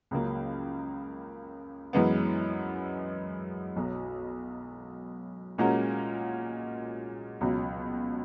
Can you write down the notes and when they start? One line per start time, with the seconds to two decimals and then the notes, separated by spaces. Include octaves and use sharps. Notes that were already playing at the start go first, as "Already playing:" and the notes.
0.11 C#2 C#3 F#3 A#3
1.93 F#2 E3 G#3 B3
3.76 B1 B2 F#3
5.58 A#2 G#3 C#4 F#4 A#4
7.41 C#2 B2 F#3